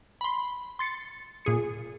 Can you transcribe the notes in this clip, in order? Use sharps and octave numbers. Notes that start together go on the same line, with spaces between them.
B5 C6
C6 A6 C#7
A#2 G#4 C#7